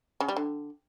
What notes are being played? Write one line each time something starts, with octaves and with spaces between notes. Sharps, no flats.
C#3
G3
D3